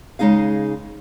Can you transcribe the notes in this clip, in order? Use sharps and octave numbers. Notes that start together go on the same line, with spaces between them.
C#3 G#3 D#4 G#4 F5